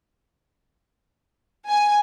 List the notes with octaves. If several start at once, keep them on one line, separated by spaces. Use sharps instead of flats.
G#5